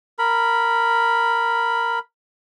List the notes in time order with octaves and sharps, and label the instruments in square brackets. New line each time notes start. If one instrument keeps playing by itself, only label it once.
[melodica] A#4 B5